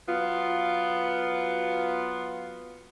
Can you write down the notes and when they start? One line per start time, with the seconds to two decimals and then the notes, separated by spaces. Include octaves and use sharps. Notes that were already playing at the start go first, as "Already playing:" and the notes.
0.08 F#3 B3 F4